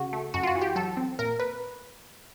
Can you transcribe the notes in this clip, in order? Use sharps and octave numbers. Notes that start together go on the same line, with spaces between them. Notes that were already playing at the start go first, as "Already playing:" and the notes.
Already playing: C#3 F#4
A3
F#2 F#4
F4
F#4
E3
G4
F#3 A4
C4
A#2 A#4
B4